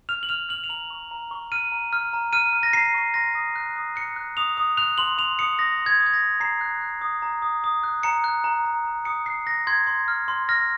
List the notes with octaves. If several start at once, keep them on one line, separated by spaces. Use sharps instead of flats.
F6 F7
F#7
F6 F7
F6 F#7
F7
A#5 F#7
C#6
A#5
C#6
F6 D#7
A#5
F6
A#5
F6 D#7
F6
A#6
A#5 C7
C#6
C6 A#6
D#6
F#6
D#6
F#6 C#7
F#6
D#6 F7
D#6
F#6 F7
C6 F#7
C6 F7
D#6 C#7
D#6 A#6
C6
G#6
D#6
G#6
A#6
C6
A#5 C7
F#6
F#6
D#6
A#5
D#6
D#6
F#6
A#5 C#7
F#6
A#5
A#5
A#5
D#6 C#7
F#6 C7
D#6 A#6
C6 G#6
C6
F6
C6
F6 A#6